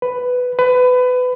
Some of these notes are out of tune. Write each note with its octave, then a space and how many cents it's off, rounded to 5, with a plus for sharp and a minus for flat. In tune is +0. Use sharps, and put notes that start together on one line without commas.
B4 +10
B4 +25